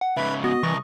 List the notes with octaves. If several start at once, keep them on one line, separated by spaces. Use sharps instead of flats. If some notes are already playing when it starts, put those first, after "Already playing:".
F#5
G#2 C#3 B4 E5
B3 F#4 D#5
C2 E3 C#6